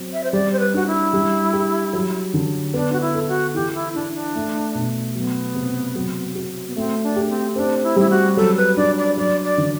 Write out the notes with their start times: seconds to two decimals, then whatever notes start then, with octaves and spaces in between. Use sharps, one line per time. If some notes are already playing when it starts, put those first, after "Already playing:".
Already playing: F#3 C4
0.13 E5
0.24 C5
0.33 G3 D5
0.53 C5
0.60 B4
0.74 D4 F#4
0.87 E4
1.13 G3
1.53 G4
1.93 F#3
2.34 D3
2.74 B3 D4
2.92 F#4
3.01 E4
3.15 A4
3.28 F#4
3.54 E3 G4
3.75 E4
3.94 D4 E4
4.14 D4
4.35 A3
4.75 B2
5.15 F#3 B3
5.55 C3
5.95 F#3
6.35 F#4
6.68 B3
6.76 A3 C4
7.03 D4
7.16 G4
7.29 C4
7.56 C4 D4
7.83 E4
7.96 G3 E4
8.10 F#4
8.37 F#3 A4
8.57 B4
8.77 D4 D5
8.98 D5
9.17 F#3 D5
9.44 D5
9.58 D3